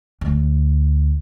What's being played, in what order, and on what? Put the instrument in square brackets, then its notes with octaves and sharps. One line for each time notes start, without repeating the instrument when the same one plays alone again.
[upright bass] D2